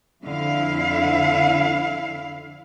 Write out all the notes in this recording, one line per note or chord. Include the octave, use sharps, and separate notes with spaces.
F2 D3 E4 F5